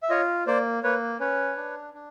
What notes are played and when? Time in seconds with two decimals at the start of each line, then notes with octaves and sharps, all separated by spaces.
0.03 E5
0.10 F4 C#5 D#5
0.47 A#3 C5 D5
0.83 A#3 B4 C#5
1.20 C#4 B4 C#5
1.57 D4
1.94 D4